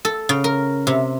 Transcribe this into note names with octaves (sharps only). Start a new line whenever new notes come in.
A4
C#3
A#4
C3